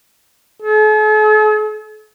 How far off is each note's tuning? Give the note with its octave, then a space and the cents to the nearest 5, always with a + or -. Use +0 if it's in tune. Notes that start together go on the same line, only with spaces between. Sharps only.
A4 -45